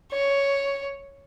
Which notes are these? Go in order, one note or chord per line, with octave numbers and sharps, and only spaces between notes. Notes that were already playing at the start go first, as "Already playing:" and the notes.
C#5